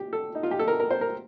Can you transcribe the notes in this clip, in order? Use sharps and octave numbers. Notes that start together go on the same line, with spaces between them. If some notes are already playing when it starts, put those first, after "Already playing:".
Already playing: G4
A4
D#4
F4
G4
A4
A#4
A#4
C5
A#4